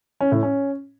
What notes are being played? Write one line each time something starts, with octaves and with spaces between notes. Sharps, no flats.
C#4
A2
C#4